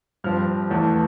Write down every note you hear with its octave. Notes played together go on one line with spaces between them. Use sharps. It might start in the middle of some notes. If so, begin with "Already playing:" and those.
G2 F3 C4 F6
E2 E3 A3